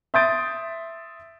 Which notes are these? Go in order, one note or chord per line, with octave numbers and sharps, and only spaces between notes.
E5 C6 D#6 G6 A6 D7